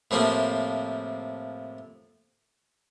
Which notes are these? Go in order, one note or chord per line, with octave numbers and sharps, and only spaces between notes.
A2 C3 F3 A#3 C4